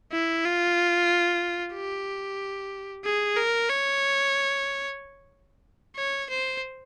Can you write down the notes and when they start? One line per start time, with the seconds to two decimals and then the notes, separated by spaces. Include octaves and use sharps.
0.12 E4
0.45 F4
1.75 G4
3.05 G#4
3.37 A#4
3.69 C#5
5.96 C#5
6.30 C5